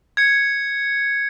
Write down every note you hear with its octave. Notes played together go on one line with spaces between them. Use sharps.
G#6 C#7